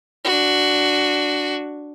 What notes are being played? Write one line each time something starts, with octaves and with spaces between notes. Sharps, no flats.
D4 F#4